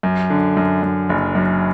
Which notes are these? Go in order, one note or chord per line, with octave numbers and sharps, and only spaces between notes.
F#2
D3
F#2
F#2
F#1
F#2